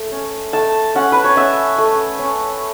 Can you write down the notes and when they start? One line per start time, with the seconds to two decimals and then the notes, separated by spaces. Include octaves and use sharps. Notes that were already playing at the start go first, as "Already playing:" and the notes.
Already playing: A3
0.12 C#4
0.53 A3 A5
0.95 C#4 F#5
1.12 B4
1.24 C#5
1.36 C#4 E5
1.78 A3
2.19 C#4